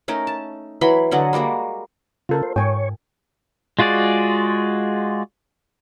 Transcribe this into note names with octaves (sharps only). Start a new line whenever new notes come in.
A3 C#4 D#4 A#4
A5
E3 F#3 B5 C6
D3 F#3 D#5 F#5
G3 G#3 A#3 F#4
C#3 F4 A4 A#4
C5
G#2 C#5 G5 G#5
G#3 F4 F#4 G#4 D5